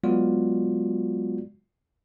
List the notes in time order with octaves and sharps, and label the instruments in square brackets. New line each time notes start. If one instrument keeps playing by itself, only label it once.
[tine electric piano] F#3 G#3 B3 F4 F#4 D5